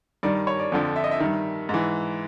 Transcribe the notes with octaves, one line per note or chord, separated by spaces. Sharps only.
G2 D#3 D5
C#5
D5
F2 D3 F3
E5
D#5
E5
G2 D#3
G#2 E3